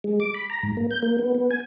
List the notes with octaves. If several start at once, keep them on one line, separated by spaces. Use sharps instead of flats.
G#3
D6
B5
A#5
G#2
A#3
G6
A#3
B3
B3
G#5